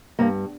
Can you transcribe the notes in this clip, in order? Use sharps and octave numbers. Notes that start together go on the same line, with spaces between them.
G2 A#3